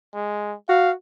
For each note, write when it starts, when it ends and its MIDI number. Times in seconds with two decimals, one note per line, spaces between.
0.14 0.55 56
0.69 0.91 66
0.69 0.90 77